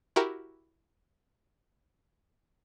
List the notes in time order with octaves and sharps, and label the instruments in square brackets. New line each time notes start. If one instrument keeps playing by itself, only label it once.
[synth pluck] E4 F#4 G4 A#4